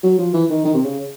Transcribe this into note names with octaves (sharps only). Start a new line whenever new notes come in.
F#3
F3
E3
D#3
D#3
C3
C#3